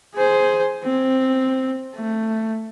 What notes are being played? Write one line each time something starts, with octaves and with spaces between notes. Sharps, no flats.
G#4 C5
C4
A3